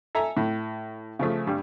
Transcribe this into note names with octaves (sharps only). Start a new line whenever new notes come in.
A4 E5 G#5 A#5
A2
C#3 F3 A3
G2 G3